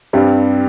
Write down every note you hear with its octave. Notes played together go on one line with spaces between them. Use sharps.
G2 G3 C4